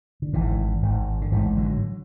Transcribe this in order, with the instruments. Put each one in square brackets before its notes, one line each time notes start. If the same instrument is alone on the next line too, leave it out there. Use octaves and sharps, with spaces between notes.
[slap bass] D3
G#1 G#2 E3
G#1 G#2
D3
A1 E3
G#2
D3 F#3